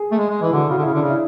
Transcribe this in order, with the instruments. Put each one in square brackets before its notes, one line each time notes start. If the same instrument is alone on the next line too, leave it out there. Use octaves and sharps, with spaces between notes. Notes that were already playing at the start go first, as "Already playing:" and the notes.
Already playing: [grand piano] G#4
[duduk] A3
G#3
G#3
E3
[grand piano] E4
[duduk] D3 [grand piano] F#4
[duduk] C#3 [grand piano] F#4
[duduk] D3
[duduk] C#3 [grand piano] E4
[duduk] D3 [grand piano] D4
[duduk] C#3
[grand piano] E4